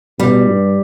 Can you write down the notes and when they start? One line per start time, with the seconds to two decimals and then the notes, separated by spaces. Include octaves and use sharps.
0.19 B2 G3
0.48 G2